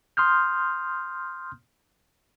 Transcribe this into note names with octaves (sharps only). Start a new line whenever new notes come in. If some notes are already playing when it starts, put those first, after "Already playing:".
C6 D#6 F6 G6